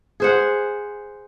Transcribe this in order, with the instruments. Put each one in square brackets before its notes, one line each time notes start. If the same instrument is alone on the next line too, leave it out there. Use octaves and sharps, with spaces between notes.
[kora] G#4 C5 F#5